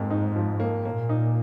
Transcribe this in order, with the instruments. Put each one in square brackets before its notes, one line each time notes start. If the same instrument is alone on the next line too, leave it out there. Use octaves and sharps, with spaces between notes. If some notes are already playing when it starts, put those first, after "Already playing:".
Already playing: [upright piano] F2 A#3 [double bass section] G#2
[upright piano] D#4
F3
A#3
[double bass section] A#2 [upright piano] A#3
[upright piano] D#4